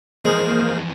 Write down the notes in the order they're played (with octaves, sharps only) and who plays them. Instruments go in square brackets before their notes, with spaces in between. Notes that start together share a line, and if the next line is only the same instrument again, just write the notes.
[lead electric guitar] F2 E3 [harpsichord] G#3 [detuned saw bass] A#3 [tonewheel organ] G#4 A#4 C5